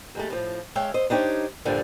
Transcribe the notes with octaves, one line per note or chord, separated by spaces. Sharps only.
D#2 G#3 A3
A2 F3
G#3 C#5 E5 F5 G5
C5 D#5
D4 D#4 G4 C5 C#5
G2 A#2 D3 F3